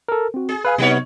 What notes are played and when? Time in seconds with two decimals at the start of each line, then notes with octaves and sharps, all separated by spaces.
0.08 A4 A#4
0.34 C4 F#4
0.49 G#4
0.65 B4 F5 G#5
0.78 C3 F#3 B3 D#4 C#5